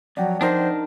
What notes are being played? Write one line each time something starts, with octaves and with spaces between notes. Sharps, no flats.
F2 F#3 D5 F#5 G5
D4 D#4 A#4 C5